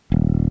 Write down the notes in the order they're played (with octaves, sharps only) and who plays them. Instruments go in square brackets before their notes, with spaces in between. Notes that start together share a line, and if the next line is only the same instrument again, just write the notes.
[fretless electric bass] D#1